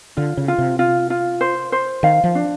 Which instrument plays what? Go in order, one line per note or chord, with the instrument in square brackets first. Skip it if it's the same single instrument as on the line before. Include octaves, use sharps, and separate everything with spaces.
[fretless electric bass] D3 [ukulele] F4
[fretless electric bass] C#3
[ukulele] F4
[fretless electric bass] C3
[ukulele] F4
F4
C5
C5
[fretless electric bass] D#3 [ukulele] F5
[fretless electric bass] F3
[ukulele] D4